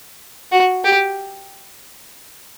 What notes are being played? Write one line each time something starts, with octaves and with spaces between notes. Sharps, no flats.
F#4
G4